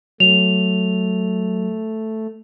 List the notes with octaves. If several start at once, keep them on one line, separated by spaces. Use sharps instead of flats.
F#3 A3 F7